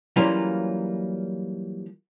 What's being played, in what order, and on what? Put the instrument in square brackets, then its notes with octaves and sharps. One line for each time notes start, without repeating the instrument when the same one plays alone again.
[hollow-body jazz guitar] E3 F#3 G3 A#3 C#4 F4